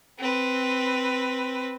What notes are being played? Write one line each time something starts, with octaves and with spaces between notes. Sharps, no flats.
C4 B4